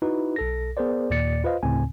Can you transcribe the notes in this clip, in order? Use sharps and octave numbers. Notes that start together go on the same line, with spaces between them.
D#4 E4 F#4 B4
B1 A4 A#6
B3 G#4 A#4 C5 D5
D#2 A#2 D5 A6 C#7
F4 B4 C5 D#5 F5
D2 A2 C#3 C4 G#5